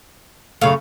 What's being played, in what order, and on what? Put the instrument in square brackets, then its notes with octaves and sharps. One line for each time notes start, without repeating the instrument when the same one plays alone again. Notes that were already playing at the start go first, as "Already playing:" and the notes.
[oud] F#2 C#3 A3 [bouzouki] F5